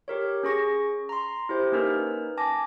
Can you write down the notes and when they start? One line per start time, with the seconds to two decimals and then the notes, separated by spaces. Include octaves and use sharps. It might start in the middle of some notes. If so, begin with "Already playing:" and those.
0.08 G4 A#4 C#5
0.43 C#4 G#4 C#6 A#6
1.09 A#5 C6
1.49 E4 G4 C5
1.72 A#3 C#4 D#4 A#4 B4
2.37 G#5 A5 D6 A#6